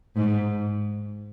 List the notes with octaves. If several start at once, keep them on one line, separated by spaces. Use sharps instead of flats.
G#2